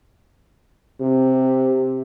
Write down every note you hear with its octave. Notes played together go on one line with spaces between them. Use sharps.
C3